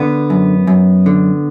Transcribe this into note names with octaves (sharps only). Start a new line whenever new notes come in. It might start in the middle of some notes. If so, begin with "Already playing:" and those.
Already playing: D3 B3
F#2
F#2
D3